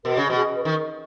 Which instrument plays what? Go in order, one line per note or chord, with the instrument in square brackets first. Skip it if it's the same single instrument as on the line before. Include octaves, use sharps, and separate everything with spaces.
[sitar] B2 [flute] A#4
[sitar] C#3
B2
[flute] G#4
B4
[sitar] D#3 [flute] A#4